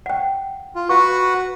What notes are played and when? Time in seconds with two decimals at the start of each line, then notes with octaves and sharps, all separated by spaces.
0.06 F#5 G5
0.75 F4
0.89 F#4 B4 F#5 C#6